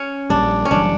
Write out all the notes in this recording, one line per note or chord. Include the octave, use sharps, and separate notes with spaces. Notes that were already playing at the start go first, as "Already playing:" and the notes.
Already playing: C#4
A#1 A#2 G3 D4
C#4
F#1 F#2 E3 G3 D4